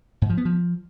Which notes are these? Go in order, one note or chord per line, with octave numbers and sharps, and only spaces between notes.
G#2
F3
B3
F3